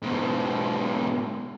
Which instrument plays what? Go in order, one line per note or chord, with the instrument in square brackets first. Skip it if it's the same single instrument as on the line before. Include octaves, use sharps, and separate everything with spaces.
[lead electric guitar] G#2 B2